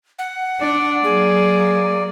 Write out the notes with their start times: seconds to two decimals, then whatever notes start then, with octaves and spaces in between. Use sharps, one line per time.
0.18 F#5
0.61 D4 D5
1.03 F#3 A#3 G#4